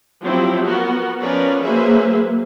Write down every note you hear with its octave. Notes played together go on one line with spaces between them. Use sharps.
F3 F#3 C4 E4 G4
B3 F#4 A#4
F3 C#4 A#4 B4 D5
F#3 A#3 G#4 B4 C5 E5